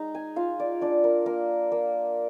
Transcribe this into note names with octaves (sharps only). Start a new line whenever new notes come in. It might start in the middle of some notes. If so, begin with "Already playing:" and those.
Already playing: G#3 D#4 A#5
G#5
F4 F5
D5
D4 D5
A#4
A#3 A#4
A#3